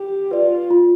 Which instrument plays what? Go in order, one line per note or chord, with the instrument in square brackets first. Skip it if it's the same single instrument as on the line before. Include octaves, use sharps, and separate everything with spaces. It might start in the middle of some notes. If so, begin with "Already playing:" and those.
Already playing: [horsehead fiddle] G4
[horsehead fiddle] F4 [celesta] B4 D5
[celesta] F4